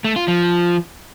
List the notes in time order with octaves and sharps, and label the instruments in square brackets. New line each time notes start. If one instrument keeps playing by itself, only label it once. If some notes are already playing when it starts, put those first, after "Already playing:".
[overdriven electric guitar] A3
F4
F3